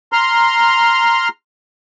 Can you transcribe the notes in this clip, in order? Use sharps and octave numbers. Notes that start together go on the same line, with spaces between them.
A#5 C6 F6